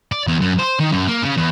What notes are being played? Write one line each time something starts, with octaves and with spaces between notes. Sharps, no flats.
D5
E2
F#2
C5
D#3
F#2
A#3
C#3
E2